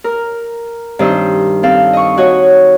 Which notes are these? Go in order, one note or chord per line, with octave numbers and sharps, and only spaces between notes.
A#4
G2 D#3 C4 C5 D#5 E6
C4 A4 F5
D#5 C#6
F#4 C#5 D#5